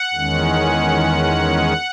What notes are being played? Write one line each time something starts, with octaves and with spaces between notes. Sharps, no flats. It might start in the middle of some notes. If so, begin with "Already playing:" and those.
Already playing: F#5
E2 D#3 G#3 C#4